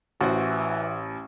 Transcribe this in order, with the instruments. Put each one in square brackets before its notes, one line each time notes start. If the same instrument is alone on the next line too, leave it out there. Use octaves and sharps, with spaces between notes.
[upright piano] A1 [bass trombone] E3 [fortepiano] F#4 C5